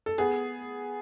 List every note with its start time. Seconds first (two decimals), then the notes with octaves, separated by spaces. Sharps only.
0.06 A4
0.18 B3 G#4